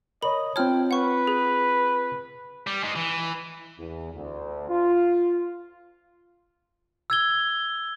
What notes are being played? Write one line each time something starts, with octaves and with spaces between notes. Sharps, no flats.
A#4 C#5 D#5 B5
C4 F4 C#5 G5 A5 F6
B4 F#5 C#6
G#4
G3
G#3 D#4
E3
E2
D2
F4
E6 G#6 G7